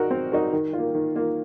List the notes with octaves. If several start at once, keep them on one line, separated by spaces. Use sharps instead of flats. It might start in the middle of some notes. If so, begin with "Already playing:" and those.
Already playing: D#4 F#4 A#4
C4
D#4 F#4 A#4
D#3
A#3 F4
D#3
A#3 F4